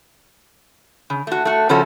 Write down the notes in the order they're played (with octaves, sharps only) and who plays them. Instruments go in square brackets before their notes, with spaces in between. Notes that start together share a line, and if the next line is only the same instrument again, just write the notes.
[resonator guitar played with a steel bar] C#3
A3 F#4
A3 F#4
C#3 F3 C#4 F#4 A4